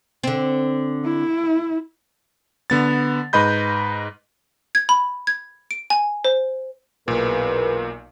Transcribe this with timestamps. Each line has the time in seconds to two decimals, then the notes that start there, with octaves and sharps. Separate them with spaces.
0.23 D3 C4
1.04 E4
2.70 D3 B3 A6
3.33 G#2 B4 D#5 B5 G6
4.75 G#6
4.89 B5
5.27 G#6
5.71 D7
5.90 G#5
6.25 C5
7.08 B1 E2 A#2 A#4 B4